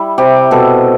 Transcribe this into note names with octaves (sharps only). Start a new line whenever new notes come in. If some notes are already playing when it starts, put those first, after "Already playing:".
Already playing: G3 E4
C3 G4
B2 A4